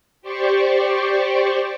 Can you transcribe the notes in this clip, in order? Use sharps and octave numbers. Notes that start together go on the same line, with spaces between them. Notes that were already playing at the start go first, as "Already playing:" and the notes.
G4 C5 D5 C#6